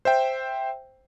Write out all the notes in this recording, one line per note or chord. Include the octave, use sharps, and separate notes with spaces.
C5 E5 G5